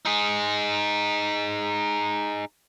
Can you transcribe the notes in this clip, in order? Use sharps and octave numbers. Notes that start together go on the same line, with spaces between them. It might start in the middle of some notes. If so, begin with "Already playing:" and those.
D#4 G#4